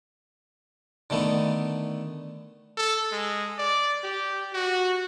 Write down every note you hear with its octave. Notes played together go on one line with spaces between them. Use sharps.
D3 D#3 A3 B3
A4
G#3
D5
G4
F#4